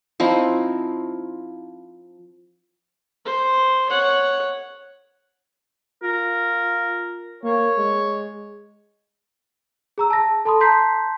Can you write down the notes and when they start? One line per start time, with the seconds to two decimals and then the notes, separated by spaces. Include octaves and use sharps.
0.20 F3 C4 D#4 E4
3.25 C5
3.90 C#5 F#5
6.03 F4 A#4
7.43 A#3 C#5
7.77 G#3
9.98 G#4 A#5 E6
10.10 A5 A#6
10.45 A4 A5 B5 C6 D#6
10.61 A5 A#5 C6 G6 B6 C7